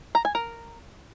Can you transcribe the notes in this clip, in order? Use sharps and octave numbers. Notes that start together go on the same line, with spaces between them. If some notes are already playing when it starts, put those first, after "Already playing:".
A#5
G#5
A#4